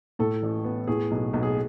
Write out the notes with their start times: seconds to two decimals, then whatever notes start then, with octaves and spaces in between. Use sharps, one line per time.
0.19 A2 A4
0.43 A1
0.64 B3
0.87 A2 G#4
1.11 B1
1.33 B1
1.43 G#4